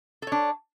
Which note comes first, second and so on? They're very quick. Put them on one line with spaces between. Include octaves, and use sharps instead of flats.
A4 C#5 D4